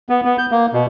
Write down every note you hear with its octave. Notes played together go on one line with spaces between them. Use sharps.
B3
B3
G6
A#3
B2